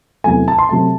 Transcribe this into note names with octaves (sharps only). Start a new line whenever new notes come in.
E2 C3 F#3 A3 G#5
A5
C6
C3 F#3 A3 A5